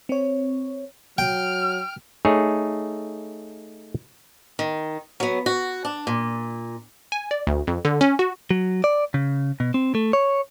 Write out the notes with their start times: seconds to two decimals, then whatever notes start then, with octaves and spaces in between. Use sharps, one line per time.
0.09 C4 C#5
1.18 F#3 G5 F6
2.25 A3 D#4 G#4 C#5
4.59 D#3
5.20 F#3 B3
5.46 F#4
5.85 D4
6.07 A#2
7.12 G#5
7.31 D5
7.47 D2
7.67 F2
7.85 D3
8.01 C#4
8.19 F#4
8.51 F#3
8.84 D5
9.14 C#3
9.60 B2
9.74 C4
9.95 A3
10.13 C#5